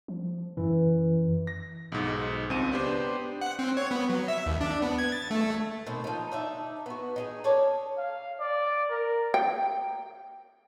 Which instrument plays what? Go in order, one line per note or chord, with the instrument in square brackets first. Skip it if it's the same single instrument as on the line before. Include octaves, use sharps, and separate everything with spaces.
[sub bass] F3
[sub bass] F#2 [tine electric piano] E3
[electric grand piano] A#6
B1 G#2
C#2 C4 D#4 D#7
B3 D4 G4 C5
[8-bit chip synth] F#5
C4
C#5
B3
F#3
E5
D#2
D4
B3
G#6
A6
A3
[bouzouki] B2 D#3 C4
F3 D#4
D4 D#4 E5
B3 F#4
D#4 G4 G#4
C#4 A4 C#5 D5
[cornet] F5
D5
A#4
[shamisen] G5